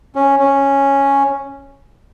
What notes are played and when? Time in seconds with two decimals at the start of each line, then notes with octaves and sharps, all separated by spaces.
0.16 C#4
0.39 C#4